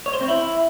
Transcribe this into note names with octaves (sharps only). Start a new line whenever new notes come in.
C#5
C5
C4
E4